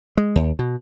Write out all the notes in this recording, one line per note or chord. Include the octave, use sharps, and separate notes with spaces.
G#3
D#2
B2